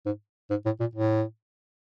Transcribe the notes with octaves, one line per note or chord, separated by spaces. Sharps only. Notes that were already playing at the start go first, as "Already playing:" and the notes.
G#2
G#2
A2
A#2
A2